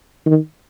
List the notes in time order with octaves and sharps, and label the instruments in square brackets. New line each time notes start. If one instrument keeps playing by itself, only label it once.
[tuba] D#3